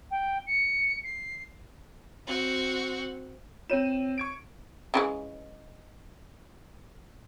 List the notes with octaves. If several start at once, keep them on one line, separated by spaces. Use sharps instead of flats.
G5
C#7
C7
C4 F#4
C4 F4 C#5 D#7 E7
C#6 G#6 D7
C#3 E3 G#3